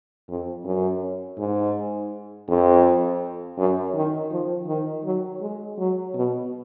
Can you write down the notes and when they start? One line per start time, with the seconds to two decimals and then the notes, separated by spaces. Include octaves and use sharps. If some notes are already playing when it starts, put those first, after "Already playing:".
0.29 F2
0.64 F#2
1.38 G#2
2.49 F2
3.57 F#2
3.94 D#3
4.31 F3
4.67 D#3
5.04 F#3
5.41 G#3
5.78 F#3
6.14 B2